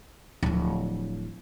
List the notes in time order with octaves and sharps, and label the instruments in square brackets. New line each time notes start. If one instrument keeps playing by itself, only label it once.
[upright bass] D1 F3